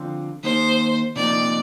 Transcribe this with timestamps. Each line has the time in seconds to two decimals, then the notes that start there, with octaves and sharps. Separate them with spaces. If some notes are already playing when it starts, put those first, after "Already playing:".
Already playing: D3 F3 C4 F4
0.43 D#3 A#3 D#4 C5
1.16 C3 F3 A#3 D#4 D5